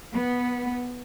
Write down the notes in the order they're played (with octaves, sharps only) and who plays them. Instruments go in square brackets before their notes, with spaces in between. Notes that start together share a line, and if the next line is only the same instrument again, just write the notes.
[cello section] B3